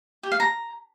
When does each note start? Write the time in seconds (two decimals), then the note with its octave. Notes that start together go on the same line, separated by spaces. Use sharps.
0.23 G4
0.32 F5
0.40 A#5